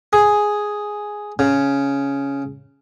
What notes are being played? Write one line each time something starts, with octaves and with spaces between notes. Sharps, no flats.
G#4
C#3